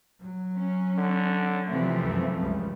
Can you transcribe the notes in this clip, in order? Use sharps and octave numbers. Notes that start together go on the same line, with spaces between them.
F#3
C#4
D3
C3 E3 F3 A3
C#2 F#2
C#2 G3